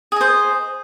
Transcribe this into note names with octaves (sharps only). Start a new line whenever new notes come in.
G#4 C5 D#5